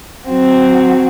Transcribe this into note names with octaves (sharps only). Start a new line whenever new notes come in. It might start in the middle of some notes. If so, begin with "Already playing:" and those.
F#3 C4 F#4